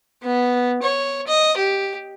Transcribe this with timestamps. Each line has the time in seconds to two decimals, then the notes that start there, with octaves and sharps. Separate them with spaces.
0.23 B3
0.82 C#5
1.27 D#5
1.57 G4